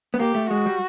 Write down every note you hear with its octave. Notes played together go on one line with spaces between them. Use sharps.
B3
A#3 G4
A3
G#3 F#4
G3